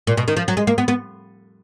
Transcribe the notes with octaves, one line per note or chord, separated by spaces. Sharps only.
A#2
B2
D#3
F3
F#3
G#3
A#3
B3
B3